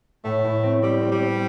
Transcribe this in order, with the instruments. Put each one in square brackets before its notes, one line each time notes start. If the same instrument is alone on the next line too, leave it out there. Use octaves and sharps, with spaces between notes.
[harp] A2 [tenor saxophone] A3
[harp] A2
C4
[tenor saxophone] G3 [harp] C4
[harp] C4
[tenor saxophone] G3
[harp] C4